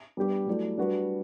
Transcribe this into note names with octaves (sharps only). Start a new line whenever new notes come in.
G3 B3 D4 G4 B4
F#3 A3 E4 A4 D5
G3 D4 F#4 B4